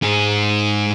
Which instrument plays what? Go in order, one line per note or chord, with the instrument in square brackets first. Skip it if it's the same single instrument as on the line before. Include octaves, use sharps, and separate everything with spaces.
[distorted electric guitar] G#2 G#4